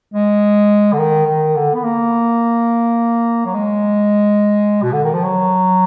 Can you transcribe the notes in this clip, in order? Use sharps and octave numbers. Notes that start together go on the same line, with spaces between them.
G#3
D3
D#3
D#3
D3
B3
A#3
F#3
G#3
B2
D3
D#3
F3
F#3